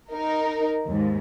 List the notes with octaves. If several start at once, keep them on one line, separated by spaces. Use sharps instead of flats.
D#4 A#4
D#2 G#2